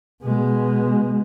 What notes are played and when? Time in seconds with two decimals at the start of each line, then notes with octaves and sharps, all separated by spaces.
0.23 B2 G#3